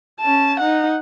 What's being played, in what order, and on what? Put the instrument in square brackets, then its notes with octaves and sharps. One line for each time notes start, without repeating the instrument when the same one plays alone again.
[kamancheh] C#4 A5
D#4 F#5